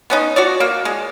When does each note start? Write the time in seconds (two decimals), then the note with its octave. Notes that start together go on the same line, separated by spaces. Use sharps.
0.10 B3 C#4 D#4
0.36 F#4 C#5 D5
0.60 A#3
0.85 G#3